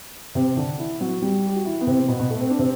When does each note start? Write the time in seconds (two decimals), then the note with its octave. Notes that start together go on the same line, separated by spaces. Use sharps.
0.35 C3 C4
0.57 D3 D4
0.79 E3 E4
1.00 F#3 F#4
1.22 G3 G4
1.47 G4
1.56 F#4
1.65 E3 E4
1.81 B3
1.87 C3 C4
2.08 B2 B3
2.19 B2 B3
2.30 A3
2.41 C4
2.50 D4
2.59 C3 C4